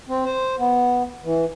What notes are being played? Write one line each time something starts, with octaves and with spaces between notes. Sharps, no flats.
C4
C5
B3
E3